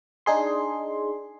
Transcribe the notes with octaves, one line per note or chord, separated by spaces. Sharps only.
D4 D#4 G#4 C6